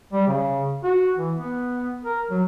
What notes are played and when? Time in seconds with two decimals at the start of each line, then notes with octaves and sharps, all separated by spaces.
0.13 G3
0.27 C#3
0.84 F#4
1.17 E3
1.38 B3
2.05 A#4
2.30 F#3